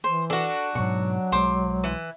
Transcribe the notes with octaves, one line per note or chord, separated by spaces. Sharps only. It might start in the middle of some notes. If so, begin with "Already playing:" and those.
E3 C5
D4 F#4 A4
G#2 B2 F#3 C#6
B1 G#3 C5 D6
E3